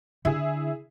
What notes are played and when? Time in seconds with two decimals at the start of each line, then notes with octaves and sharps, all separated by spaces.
0.25 D3 E4 G#4